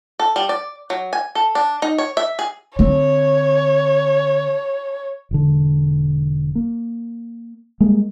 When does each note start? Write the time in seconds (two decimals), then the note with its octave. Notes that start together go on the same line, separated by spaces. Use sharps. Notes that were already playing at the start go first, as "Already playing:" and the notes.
0.20 A4
0.36 G3
0.49 D5
0.90 F#3
1.13 G#5
1.35 A4
1.55 D4
1.82 D#4
1.98 C#5
2.17 E5
2.39 G#4
2.79 D3 C4 C#5
5.31 E1 D3
6.55 A#3
7.80 G3 G#3 A#3